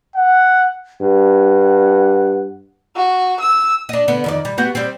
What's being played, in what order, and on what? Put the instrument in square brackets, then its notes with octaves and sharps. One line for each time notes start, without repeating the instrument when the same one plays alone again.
[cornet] F#5
[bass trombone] G2 [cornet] F#5
[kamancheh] F#4
E6
[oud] D4 D#5
D3 B3
F2 D#3 D5
G3
B3 F#4 G4
G3 C4